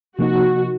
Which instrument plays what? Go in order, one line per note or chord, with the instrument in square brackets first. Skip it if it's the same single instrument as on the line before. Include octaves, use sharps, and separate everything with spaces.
[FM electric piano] C3 F3 A#3 D#4 [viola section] F#4